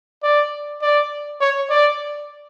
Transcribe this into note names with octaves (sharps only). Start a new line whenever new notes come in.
D5
D5
C#5
D5